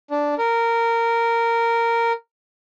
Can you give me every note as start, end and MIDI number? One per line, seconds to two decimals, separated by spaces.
0.11 0.34 62
0.39 2.12 70